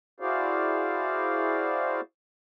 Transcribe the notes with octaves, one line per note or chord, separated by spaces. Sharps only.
E4 F#4 G#4 C5 D5 F5